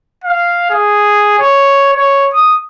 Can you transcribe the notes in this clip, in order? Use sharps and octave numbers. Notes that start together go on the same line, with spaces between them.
F5
G#4
C#5
C#5
D#6